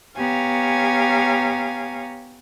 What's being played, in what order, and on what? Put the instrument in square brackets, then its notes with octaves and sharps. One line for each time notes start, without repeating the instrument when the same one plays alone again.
[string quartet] B3 G4 C#5 F5 G#5 A#5